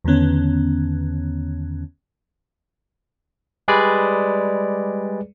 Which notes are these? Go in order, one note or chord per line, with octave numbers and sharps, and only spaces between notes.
E2 D3 D#3 B3 C#4
G3 G#3 G#4 B4 D5